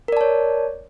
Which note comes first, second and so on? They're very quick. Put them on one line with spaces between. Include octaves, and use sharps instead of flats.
A#4 D5 A5 C#5